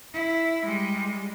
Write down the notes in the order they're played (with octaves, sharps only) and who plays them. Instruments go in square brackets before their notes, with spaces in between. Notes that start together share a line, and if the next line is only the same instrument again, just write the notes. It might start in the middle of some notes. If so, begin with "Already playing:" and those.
[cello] E4
G3 G#3